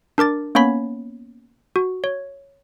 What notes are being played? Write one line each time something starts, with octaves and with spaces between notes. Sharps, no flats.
D4 A#4 D6 A6
A#3 B3 C#4 C#5 B5 B6
F#4
C#5